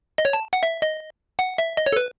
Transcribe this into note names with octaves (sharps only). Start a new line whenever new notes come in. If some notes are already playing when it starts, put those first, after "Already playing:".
D#5
C#5
A5
F#5
E5
D#5
F#5
E5
D#5
C#5
A4
B4